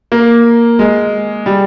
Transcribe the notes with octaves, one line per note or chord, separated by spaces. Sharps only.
A#3
G#3
G3